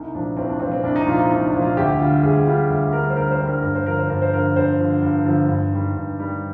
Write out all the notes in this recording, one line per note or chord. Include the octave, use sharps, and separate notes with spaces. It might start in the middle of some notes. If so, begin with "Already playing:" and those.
Already playing: C2 D#4
A#2 F3 D4
C2 C4
D4
A#2 F3 C4
C4
C2 D4
D#4
A#2 F3 F4
D#4
C2 D#4
D4
A#2 F3
F4
D2 G4
D3 G3 F4
D2 G#4
D3 G3 F4
D2
D3 A#4
G3
C5
D2 A#4
C5
D3 G3
A#4
G2 A#4
C5
D3 F3 A#4
C5
G2 A#4
C5
D3 F3 A#4
G2 C5
D3 F3
G2
D3 F3
G2
D#3 G3
G2
D#3 G3